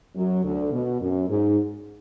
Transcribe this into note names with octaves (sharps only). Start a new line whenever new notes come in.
F#2 F#3
D2 D3
B2
F#2
G#2